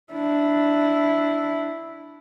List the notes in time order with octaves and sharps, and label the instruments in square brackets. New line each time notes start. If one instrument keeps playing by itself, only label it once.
[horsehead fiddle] D4 E4